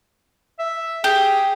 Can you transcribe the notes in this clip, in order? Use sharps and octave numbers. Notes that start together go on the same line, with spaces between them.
E5
G4 G#4